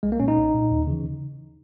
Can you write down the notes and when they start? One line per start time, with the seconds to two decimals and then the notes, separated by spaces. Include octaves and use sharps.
0.03 B1 G#3
0.12 A#3
0.20 A#2 C#4
0.28 D#4
0.37 B1
0.54 A#2
0.71 D#2
0.87 C#3 E3